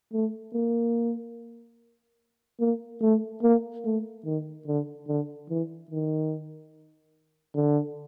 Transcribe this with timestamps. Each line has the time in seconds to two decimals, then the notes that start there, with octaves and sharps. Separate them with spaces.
0.13 A3
0.54 A#3
2.60 A#3
3.02 A3
3.43 A#3
3.85 A3
4.25 D#3
4.67 D3
5.08 D3
5.50 E3
5.91 D#3
7.55 D3